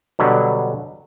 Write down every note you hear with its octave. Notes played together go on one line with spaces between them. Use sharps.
B2 D3 F#3 G3